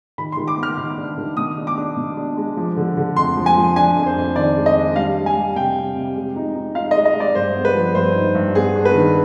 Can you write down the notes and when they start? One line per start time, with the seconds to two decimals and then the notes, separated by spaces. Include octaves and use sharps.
0.18 D#3 B5
0.32 C6
0.37 D#3
0.48 D6
0.57 B3
0.63 F6
0.78 D#3
0.97 D4
1.18 D#3
1.37 B2 D#6
1.57 D4
1.67 D6
1.78 D4
1.96 B2
2.17 D4
2.37 G#3
2.57 F3
2.77 D3
2.97 D3
3.17 F2 C6
3.37 F3
3.46 G#5
3.57 F3
3.76 D4 G#5
3.96 F2
4.06 C5
4.16 F2
4.36 D#3 D5
4.56 G#3
4.66 D#5
4.76 D4
4.96 G3 F5
5.17 G3
5.26 G#5
5.36 G3
5.56 C3 G5
5.76 C3
5.96 C3
6.16 G#3
6.36 D#4
6.55 D#4
6.75 D#4 F5
6.91 D#5
6.95 G#3
7.05 D#5
7.15 G#3
7.20 D5
7.35 G2 C5
7.56 B3
7.65 B4
7.75 F3
7.95 G2 C5
8.16 D#4
8.35 G2
8.55 B3 G#4
8.76 D4
8.85 B4
8.95 D#3